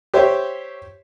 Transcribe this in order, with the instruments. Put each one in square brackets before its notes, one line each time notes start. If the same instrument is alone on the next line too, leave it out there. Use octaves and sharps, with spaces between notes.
[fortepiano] G4 C5 C#5 E5